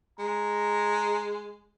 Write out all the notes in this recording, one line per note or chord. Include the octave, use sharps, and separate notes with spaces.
G#3 A#5